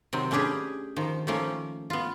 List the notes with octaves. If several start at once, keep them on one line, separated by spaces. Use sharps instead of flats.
C3 D#3 F#3 C4
A3 C#4 D4 G4 G#4 B4
D#3 F3
D#3 F3 A3 A#3 C#4
B3 F4